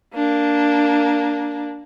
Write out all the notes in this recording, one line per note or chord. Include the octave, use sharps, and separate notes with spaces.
A#3 D4